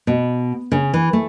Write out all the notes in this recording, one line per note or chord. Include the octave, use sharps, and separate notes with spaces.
B2
C#3
E3
A3